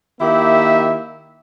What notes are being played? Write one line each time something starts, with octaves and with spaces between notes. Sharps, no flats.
D#3 A#3 E4 G4 E5